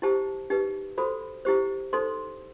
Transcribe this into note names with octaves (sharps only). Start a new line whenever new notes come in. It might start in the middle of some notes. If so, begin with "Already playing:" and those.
E4 G4 C5 A5
D#4 G4 B4
F#4 A4 C5 B5
E4 G4 C5
D#4 A4 C5 C6